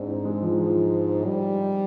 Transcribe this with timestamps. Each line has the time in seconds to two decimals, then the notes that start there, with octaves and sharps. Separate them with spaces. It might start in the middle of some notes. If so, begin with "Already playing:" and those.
Already playing: G#2 C4 D4
0.08 D#4
0.25 G#3
0.42 F3
0.59 F3
1.26 G3